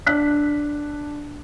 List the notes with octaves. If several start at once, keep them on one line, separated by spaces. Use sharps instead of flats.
D4 F#6 B6